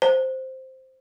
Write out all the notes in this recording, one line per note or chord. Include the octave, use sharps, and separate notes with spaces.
C5